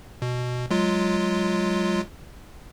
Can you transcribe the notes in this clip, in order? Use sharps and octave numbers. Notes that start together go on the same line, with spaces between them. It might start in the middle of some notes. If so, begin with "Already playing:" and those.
B2
F#3 G#3 F4